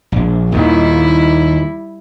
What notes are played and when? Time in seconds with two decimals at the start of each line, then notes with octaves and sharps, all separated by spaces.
0.12 A#1
0.52 D#2 A#2 D#3 G3 E4